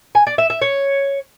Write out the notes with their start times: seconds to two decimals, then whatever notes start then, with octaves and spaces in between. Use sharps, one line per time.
0.15 G#5
0.27 D5
0.38 E5
0.50 E5
0.61 C#5